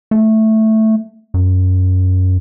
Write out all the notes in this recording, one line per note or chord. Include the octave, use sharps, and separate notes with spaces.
A3
F#2